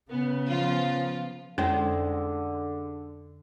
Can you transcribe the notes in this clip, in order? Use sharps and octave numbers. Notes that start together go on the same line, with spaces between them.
C#3 B3
F3 B3 F4
F2 D3 G#3 C#4 E4 C5